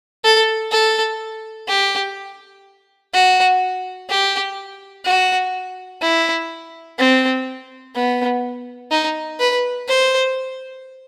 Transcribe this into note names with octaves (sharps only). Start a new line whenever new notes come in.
A4
A4
G4
F#4
G4
F#4
E4
C4
B3
D#4
B4
C5